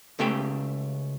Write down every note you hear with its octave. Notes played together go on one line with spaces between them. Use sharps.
C#2 C#3 A3 G4 E5 G5